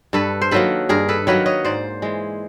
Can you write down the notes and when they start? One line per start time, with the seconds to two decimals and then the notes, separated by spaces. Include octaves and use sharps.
0.13 G2 A4 B4
0.42 C5
0.51 D#3 F#3 A#3 A4 B4
0.89 G2 G#4 A#4
1.09 A4 B4
1.27 D#3 F#3 A#3 B4 C#5
1.46 C#5 D#5
1.64 G#2 C5 D5
2.02 E3 G#3